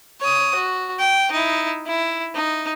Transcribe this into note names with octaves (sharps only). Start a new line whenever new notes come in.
C#5 D#6
F#4
G5
D#4 E4
E4
D#4